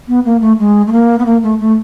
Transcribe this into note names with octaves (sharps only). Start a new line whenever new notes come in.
B3
A#3
A3
G#3
A3
A#3
B3
A#3
A3
A3